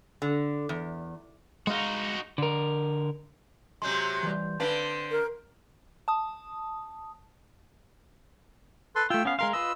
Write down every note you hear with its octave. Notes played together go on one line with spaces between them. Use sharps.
D3
E2
G#3 D#4 F#4 F5
D3 A#4
C3 F#3 G#3 C6 G6
E3 G3
D3 C4 B4 D5 F5 A5
A#4
A5 D#6
A4 B4 C6
A3 F4 G5 E6
B3 C#4 F5
G#3 A#4 F5 C6
F4 B4 D#5 E6